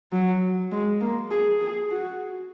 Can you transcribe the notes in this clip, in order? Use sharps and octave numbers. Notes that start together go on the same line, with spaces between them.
F#3
G#3
A#3
G#4
G#4
F#4